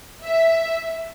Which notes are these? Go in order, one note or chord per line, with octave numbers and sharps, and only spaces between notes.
E5